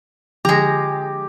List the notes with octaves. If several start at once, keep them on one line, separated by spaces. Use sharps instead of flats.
D3 F3 G#3 G4 A#5